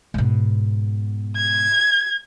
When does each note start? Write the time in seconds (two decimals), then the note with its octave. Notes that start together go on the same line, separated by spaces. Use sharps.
0.14 G#2 B2
1.37 G#6